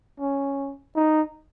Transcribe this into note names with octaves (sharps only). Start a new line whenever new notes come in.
C#4
D#4